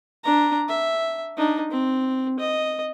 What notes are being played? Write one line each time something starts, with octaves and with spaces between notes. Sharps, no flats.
D4 A#5
E5
D4 D#4
C4
D#5